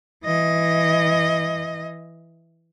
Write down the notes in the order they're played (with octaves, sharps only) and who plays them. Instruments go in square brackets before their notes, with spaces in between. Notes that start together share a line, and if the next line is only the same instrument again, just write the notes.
[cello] E3 D#5